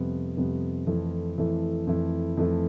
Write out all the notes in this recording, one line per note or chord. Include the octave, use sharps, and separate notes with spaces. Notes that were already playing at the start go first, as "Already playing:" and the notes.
Already playing: F2 C3 G3 B3
F2 C3 G3 B3
F2 E3 A3 E4
F2 E3 A3 E4
F2 E3 A3 E4
F2 E3 A3 E4